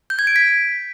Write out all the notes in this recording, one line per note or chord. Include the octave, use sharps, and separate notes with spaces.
G6
G#6
D7
B6